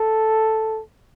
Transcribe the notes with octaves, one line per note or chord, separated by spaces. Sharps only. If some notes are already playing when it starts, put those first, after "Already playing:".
Already playing: A4